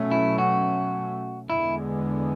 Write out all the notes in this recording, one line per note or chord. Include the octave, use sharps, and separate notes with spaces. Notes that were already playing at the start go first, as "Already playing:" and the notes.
Already playing: B2 F#3 A3 C#4
E4
F#4
E2 D3 G#3 B3 E4